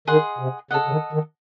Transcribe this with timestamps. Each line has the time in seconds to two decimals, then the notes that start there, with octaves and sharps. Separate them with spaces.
0.07 D#3 G#4 D#5 F#5 C6
0.39 C3
0.71 C#3 A4 D#5 F#5
0.87 C#3
0.91 D#3
1.13 D#3